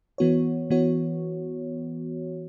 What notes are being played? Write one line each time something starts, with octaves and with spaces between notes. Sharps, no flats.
E3 B3 F#4 C#5
E3 B3 F#4 C#5